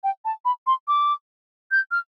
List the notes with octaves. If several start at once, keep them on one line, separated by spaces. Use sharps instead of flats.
G5
A5
B5
C6
D6
G6
F6